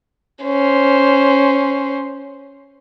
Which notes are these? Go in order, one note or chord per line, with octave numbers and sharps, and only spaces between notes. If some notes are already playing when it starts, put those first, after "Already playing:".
C#4 C5